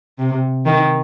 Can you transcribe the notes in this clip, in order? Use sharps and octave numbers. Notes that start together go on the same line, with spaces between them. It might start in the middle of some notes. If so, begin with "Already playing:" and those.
C3
D#3